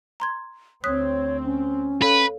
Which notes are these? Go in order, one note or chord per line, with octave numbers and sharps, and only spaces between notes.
A#5 C6 G#6
D2 C4 C#5 D#6 F#6 B6
C#4
A4 B4 C#5 F5